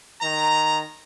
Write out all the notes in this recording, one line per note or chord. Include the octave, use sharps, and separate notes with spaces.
D#3 A#5